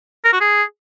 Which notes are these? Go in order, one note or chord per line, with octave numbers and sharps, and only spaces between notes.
A#4
F#4
G#4